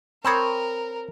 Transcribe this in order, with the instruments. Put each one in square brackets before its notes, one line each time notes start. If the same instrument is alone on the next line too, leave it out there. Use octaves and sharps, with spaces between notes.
[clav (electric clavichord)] C4 C#5 [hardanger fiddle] A#4 [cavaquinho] A5 B5 D#6